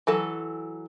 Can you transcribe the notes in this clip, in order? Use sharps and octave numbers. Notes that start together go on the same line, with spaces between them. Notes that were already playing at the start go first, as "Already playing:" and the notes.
E3 F#3 A4